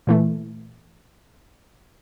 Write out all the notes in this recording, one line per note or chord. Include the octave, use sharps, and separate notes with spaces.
A#2 E3 A3